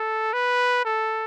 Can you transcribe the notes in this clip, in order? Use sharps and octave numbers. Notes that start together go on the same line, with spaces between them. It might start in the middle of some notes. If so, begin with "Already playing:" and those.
Already playing: A4
B4
A4